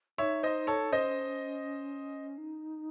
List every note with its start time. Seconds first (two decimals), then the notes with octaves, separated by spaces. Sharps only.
0.18 D#4 C#5 E5
0.43 C5 D#5
0.67 A4 C#5
0.92 C#4 C5 D#5
2.38 D#4